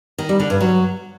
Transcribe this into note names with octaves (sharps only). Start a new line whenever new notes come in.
D#3
G3
D3
G2
F#3